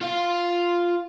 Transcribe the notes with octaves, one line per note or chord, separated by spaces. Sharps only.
F4 F5